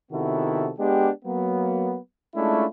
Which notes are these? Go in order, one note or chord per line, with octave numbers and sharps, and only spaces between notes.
C3 D#3 B3 E4 F#4 A4
G#3 B3 D4 G4
F#3 A#3 B3
G#3 A3 C#4 D4 E4 F4